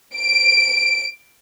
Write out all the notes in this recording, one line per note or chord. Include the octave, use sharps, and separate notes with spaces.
D7